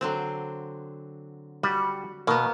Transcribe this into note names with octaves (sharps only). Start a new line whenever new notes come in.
D3 F#3 C4
G3 F#4
B2 A#3 B3